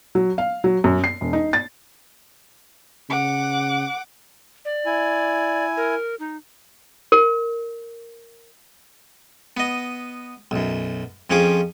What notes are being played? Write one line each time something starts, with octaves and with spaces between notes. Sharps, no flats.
F#3
F5
F#3
F#2
C7
E1
D#4
A6
C#3 F#5 D6
D5
E4 G#5
A#4
D#4
A#4
B3 D#5
B1 F#2
F2 F3 C#4 G#4 D6